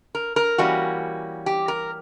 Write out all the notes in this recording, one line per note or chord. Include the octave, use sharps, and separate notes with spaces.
A#4
A#4
E3 G3 A#3 C#4 F#4
G4
A#4